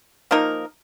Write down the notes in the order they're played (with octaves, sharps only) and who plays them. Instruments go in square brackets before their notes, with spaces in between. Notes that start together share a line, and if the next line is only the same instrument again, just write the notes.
[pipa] F3 A#3 D#4 A#4